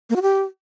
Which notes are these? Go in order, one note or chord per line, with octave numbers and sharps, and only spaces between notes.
A#3
F#4
G4